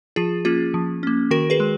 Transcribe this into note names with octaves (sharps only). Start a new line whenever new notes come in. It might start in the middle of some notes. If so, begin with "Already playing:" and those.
F3 F4 G#4
A#3 C#4 F4 G#4
F3
A#3 C#4
D#3 F#4 A#4
G#4 B4
G#3